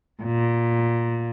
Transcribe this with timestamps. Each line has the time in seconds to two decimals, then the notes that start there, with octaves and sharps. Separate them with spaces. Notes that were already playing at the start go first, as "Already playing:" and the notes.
0.23 A#2